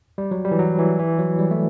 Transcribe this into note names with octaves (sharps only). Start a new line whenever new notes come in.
G3
F#3
G3
E3
F#3
E3
E3
F#3
G3
A3